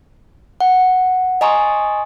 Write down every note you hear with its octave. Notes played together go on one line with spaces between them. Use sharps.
F#5
D#5 G#5 A#5 C6 C#6 D#6